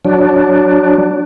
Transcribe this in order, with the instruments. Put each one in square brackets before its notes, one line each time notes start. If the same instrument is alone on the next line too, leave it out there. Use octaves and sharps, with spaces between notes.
[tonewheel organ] F#3 D4